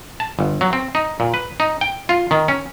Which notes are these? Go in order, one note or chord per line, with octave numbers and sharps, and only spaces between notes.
A5
G1
F#3
C4
D#4
A#2
B4
D#4
G5
F4
D#3
C#4